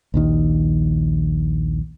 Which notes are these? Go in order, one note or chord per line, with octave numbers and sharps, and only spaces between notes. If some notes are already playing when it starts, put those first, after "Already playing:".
A#1 D#2 D#3